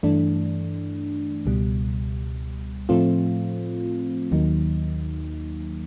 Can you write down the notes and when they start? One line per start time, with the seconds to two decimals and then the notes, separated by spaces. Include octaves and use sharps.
0.03 G2 E3 A3 D4
1.46 C#2 B2 G3
2.89 A2 F3 A3 C4 F4
4.32 D#2 D#3 F#3 A#3 D#4